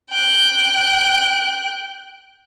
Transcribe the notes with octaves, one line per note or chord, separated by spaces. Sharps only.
G5 F#6